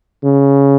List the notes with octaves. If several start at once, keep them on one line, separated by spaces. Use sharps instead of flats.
C#3